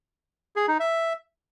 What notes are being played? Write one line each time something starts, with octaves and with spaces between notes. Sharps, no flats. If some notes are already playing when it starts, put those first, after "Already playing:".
G#4
D#4
E5